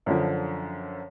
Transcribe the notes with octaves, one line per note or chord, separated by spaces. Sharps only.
F#2 D3 F3